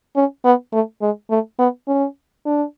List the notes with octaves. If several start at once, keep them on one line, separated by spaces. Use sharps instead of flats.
C#4
B3
A3
G#3
A3
B3
C#4
D4